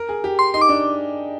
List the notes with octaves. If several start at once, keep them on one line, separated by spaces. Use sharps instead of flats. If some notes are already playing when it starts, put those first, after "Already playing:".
Already playing: A#4
G#4
G4
C6
D#4 C6
D6
D4